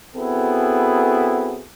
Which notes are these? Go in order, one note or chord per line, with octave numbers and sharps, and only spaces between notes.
B3 C4 E4 F#4 G#4 A4